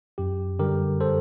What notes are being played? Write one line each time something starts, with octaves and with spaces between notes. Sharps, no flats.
F#2 G4
D3 G3 G4 A#4
A4 C5